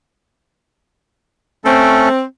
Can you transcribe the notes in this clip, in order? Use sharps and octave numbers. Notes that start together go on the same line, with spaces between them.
A3 C4 C#4 A4